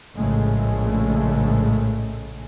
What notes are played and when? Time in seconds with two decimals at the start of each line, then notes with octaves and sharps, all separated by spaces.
0.15 A#1 A2 C#3 G#3 A3